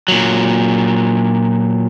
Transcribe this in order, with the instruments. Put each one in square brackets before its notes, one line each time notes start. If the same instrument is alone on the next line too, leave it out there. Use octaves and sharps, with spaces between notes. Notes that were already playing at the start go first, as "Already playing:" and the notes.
[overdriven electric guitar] A#2 F#3